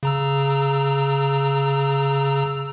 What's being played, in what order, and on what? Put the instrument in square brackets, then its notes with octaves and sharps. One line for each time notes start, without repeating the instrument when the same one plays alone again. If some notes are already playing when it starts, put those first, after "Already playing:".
[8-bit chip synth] C#3 A#5 E6